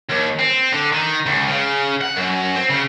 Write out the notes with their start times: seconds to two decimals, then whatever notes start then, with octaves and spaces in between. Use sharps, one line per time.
0.10 D#2
0.39 C4
0.73 D3
0.93 D#3
1.26 C#2
1.48 C#3
2.01 F#5
2.16 F#2
2.55 C4
2.69 C#3